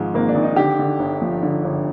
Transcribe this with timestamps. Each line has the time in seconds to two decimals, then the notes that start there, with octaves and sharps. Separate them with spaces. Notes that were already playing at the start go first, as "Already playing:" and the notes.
Already playing: G#1 G#2 F3 G#3
0.14 G#1 A#3
0.29 D4
0.35 G#1
0.43 D#4
0.56 D3 G4
0.79 D3
0.99 G1
1.21 F3
1.43 D3
1.64 G1